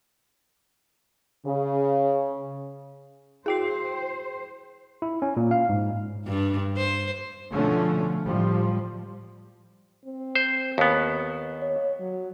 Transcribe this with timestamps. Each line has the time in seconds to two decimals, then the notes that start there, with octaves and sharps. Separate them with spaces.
1.46 C#3
3.46 E4 F#4 G#4 C5 G5 C7
5.02 E4
5.22 C#4
5.37 A#2
5.51 F5
5.69 G#2
6.27 G2
6.77 C5
7.52 B2 D3 F3 A3 C#4
8.25 A2 F3 G3
10.05 C4
10.35 C5
10.78 D#2 B3
11.62 C#5
12.00 F#3